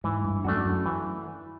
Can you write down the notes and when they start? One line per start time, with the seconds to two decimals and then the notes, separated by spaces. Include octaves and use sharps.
0.04 G#2 E3
0.24 G2
0.44 F#2 A3 D4 F#4
0.65 F#2
0.86 E3